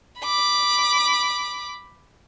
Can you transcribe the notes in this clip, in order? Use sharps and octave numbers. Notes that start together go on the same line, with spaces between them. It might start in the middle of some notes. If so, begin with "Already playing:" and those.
B5 D6